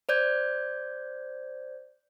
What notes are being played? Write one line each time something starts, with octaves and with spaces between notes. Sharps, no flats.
C5 D5 G6 G#6